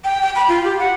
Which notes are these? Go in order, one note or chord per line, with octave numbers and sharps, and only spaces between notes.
G5
G5
B5
F4
G4
F#5